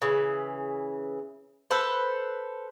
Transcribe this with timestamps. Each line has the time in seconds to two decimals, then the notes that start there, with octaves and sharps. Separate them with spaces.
0.02 C#3 E3
1.71 A4 B4 C5